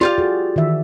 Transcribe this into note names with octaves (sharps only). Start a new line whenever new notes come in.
F4 G4 D5 F5
F#4 G#4
D#3 E3 E5